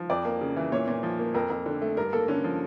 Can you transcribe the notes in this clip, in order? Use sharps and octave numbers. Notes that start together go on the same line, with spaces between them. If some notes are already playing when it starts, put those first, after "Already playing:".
Already playing: F3
F2 D5
A#3
C#3
E3
A#2 C#5
A#2
F3
A#3
F2 A#4
F2
D3
A3
G2 A#4
A#3 A4
D3 C#4
F3